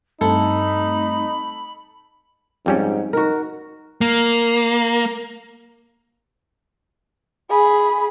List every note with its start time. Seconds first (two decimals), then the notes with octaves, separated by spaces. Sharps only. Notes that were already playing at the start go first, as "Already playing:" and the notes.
0.21 G2 A3 C4 D#4 A4 B5
2.66 F2 G#2 G3 C#4
3.13 D#4 F#4 A#4
4.01 A#3
7.50 G#4 B5